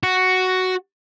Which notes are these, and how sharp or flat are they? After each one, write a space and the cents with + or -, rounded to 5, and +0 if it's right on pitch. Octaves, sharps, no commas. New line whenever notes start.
F#4 +5